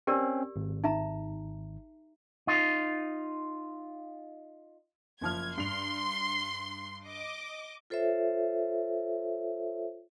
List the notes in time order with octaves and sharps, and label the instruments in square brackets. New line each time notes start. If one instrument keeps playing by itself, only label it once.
[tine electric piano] C4 C#4 [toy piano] G4 A#4 D5
[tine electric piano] G#1
[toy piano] D#4 E5 A#5
[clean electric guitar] D#4 F4
[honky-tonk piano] F#1 F3 F6 [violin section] G#6
[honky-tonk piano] G2 F7 [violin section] C6
[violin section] D#5 D6
[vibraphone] F4 A4 C5 C#5 E5